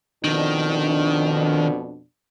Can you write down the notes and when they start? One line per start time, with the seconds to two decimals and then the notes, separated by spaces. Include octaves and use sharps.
0.24 F2 B2 D#3 D4